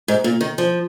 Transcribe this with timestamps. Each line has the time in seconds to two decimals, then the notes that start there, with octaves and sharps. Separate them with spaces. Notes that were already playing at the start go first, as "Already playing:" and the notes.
0.08 G#2
0.24 A#2
0.41 D#3
0.58 F3